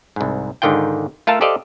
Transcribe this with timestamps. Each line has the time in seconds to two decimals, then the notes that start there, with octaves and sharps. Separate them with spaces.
0.16 C2 G#2
0.62 G#2 D3 D#3 F4 G5
1.27 A3 F4 A4 A#4 F5 A5
1.41 G4 A4 C5 D5 D#5 F5